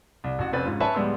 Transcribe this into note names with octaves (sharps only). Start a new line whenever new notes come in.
C2
A1 F#4
F1 C4 C#4 B4 A6
G#2 C#4 F4
B4 C#5 E5 G#5 A5 B5
D1 G3 G#3 B3 C6 E6